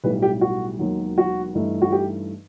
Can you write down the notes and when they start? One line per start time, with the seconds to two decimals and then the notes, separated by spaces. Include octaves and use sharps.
0.04 B1 A2 G3 B4
0.22 G4
0.41 F#4
0.79 E1 D#2 D#3 F#3
1.18 F#4
1.55 G2 E3 A3 D#4
1.82 F#4
1.92 G4